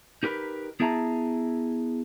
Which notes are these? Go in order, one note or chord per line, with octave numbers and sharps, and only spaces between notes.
D#4 G4 A#4 B4
B3 E4 G#4 E5 A5 A#5